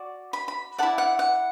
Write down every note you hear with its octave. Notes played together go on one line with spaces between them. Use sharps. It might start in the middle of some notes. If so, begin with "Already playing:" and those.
Already playing: F#4 D5
B5
B5
E4 A4 D5 F#5
F#5
F#5